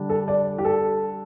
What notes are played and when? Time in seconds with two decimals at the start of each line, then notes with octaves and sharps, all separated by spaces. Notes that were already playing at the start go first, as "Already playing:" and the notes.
Already playing: D3 G3 D4
0.09 A4
0.28 D5
0.58 G4
0.65 A4